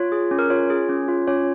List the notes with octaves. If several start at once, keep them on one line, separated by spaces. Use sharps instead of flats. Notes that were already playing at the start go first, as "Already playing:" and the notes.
Already playing: F4 C#5
G#4
C#4
A#4
F4 C#5
G#4
C#4
F4
C#4 C#5